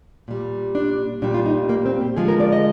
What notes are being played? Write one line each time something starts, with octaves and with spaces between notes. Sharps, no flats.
A#2 G3
D4
A#2 G3 D4
F4
D#4
A#3
C4
G4
D3 F3 G#3 G#4
A#4
D5
D#5